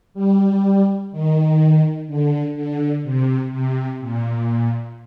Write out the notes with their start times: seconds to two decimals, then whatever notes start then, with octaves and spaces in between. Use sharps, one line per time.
0.14 G3
1.12 D#3
2.08 D3
2.55 D3
3.04 C3
3.52 C3
4.00 A#2